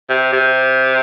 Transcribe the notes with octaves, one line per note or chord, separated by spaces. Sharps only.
C3
C3